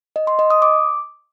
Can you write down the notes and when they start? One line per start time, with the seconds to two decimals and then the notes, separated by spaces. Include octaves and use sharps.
0.16 D#5
0.27 C6
0.39 D#5
0.50 D#6
0.62 D6